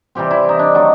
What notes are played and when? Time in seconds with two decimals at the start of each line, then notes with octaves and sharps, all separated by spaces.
0.15 C3 E3 G3 C4 G4
0.31 E4
0.49 D#4
0.59 D4
0.74 D#3 F#3 A3 D4 D#4